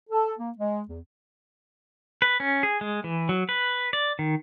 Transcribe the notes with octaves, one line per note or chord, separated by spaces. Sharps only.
A4
A#3
G#3
E2
B4
C#4
G#4
G#3
E3
F#3
B4
D5
D#3